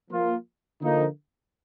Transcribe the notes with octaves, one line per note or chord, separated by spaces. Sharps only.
F3 A#3 F4
D3 F3 A#3 D#4